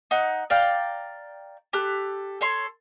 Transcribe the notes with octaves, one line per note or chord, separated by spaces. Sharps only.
D#4 F#5
D5 F5 G5 A#5
G4 A4 F#6
A4 C#5 C6